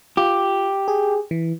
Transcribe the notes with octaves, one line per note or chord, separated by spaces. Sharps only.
F4 G4
G#4
E3